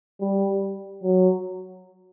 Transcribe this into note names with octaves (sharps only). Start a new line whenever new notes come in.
G3
F#3